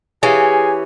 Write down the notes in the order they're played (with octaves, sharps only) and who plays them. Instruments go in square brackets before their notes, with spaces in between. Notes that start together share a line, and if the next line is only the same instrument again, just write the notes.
[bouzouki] E3 C#4 [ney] G4 [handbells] G#4 F5 [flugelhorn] G#5